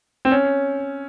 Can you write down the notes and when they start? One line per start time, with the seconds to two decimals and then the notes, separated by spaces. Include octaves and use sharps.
0.25 C4
0.31 C#4